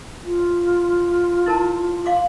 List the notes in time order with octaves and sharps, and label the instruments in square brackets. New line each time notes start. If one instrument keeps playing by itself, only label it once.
[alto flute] F4
[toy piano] E4 A#4 A5
F5 C6 D6